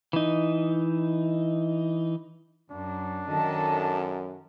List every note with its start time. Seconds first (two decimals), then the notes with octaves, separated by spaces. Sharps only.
0.13 E3 D#4
2.70 F#2 D4
3.29 F#2 D#3 A4 D#5 A5